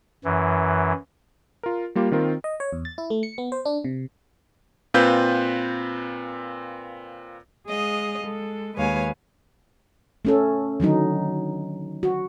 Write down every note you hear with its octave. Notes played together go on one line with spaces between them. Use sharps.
F#2 E3
F4 A#4
G3 A#3 F4 G4
D#3 C4 F4 A#4
D#5
C#5
E2
A6
E4
A3
C#7
B3
C5
D4
C3
A#2 C4 F4 B4 G6
G#3 G#4 D#5 F5
G#3 A4
D#2 G#3 B4 C#5 F5 G#5
A3 C#4 A4
D3 D#3 F#3 D#4
F#4